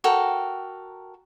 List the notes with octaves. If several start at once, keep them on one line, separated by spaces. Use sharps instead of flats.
F#4 A4 A#4 G5